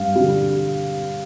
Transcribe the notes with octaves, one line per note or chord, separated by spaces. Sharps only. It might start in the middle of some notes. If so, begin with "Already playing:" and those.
Already playing: G2 F5
D3 G3